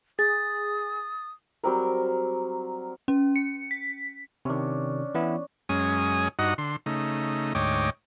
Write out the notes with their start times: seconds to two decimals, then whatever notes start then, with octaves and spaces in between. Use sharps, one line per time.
0.19 G#4 D#6 A6
1.63 F#3 G3 C4 A#4
3.08 C#4
3.36 C#7
3.71 B6
4.45 C3 D#3 C#4 D4
5.15 E3 B3 E4
5.69 F#2 G#3 C#4 G#5 D#6
6.39 G2 D#4 F#4 D#5 F#5
6.58 D3 C6
6.86 C#3 A3 D#4
7.55 D2 G#2 C#5 D#5 G5 D6